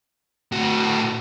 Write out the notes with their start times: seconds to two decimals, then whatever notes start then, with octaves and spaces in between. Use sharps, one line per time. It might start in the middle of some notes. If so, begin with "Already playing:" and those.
0.52 A2 F#4